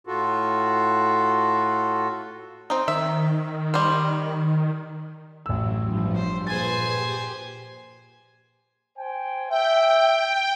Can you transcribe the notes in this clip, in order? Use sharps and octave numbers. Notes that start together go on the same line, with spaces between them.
A2 F4 F#4 A4
C4 D#4
D#3 E5
G3 C5
A1 F#3 E6
G2 F3
C5
A#2 G#4 B4 C5 G#5 A6
G4
C5 G5 G#5
E5 G5